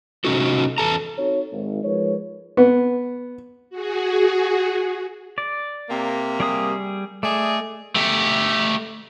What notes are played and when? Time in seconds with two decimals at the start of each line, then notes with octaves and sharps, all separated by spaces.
0.24 C3 C#4 D#4 F#4 A4
0.78 E2 G#2 A4 A#5
1.18 C4 D#4 F#4 A4 C#5
1.52 G#1
1.84 F3 G#3 D#4 A#4 B4 C#5
2.57 B3
3.70 F#4 G#4
5.38 D5
5.89 C3 A#3
6.40 G3 G#4 D#6
7.23 A3 G#4 D5 D#5
7.95 A3 G4